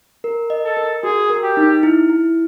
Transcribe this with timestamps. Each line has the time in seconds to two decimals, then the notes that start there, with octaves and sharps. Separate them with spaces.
0.24 A#4
0.50 D#5
0.64 A4
0.77 A#4
1.03 F#4 G#4
1.30 A#4
1.43 G4
1.57 D#4
1.83 E4
2.10 E4